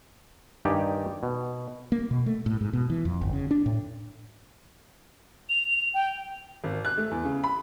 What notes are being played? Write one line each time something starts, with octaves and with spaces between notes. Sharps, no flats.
G2 D#3 D#4 G4 D5 G#5
B2
A#3
B2
A3
A2
G#2
B2
E3
F2
G1
C#3
D4
A2
F7
G5
G#1
F#6
A3
E2
C#3
B5